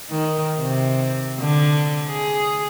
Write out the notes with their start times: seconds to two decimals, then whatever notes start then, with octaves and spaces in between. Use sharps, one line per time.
0.11 D#3
0.59 C3
1.40 D3
2.09 G#4